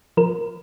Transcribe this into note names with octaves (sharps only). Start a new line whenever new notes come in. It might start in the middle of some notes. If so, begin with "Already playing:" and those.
F3 A#4